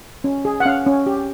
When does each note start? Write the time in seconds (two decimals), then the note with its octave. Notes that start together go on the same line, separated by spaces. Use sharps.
0.24 C#4
0.45 G#4
0.60 F#5
0.65 C#4 F5
0.86 C#4
1.06 G4